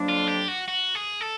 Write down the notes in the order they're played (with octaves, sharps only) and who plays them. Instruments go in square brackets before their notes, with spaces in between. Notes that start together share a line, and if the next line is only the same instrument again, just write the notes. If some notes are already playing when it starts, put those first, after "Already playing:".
Already playing: [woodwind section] F2 D3 F#3 A#3 D4
[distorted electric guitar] F4
G4
F#4
F#4
G#4
A4